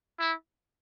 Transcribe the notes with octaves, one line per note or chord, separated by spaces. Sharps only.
E4